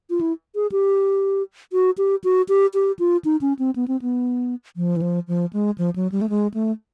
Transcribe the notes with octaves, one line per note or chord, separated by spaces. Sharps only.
F4
E4
G#4
G4
F#4
G4
F#4
G4
G4
F4
D#4
C#4
C4
B3
C4
B3
F3
E3
F3
F3
G#3
F3
F#3
G3
A3
G#3
A3